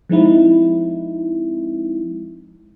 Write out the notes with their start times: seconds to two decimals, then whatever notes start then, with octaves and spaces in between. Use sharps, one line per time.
0.09 F3 G#3 C4 D#4 E4